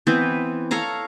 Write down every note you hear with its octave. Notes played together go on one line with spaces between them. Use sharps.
E3 B3 C4
A4 C#5 F5 A#5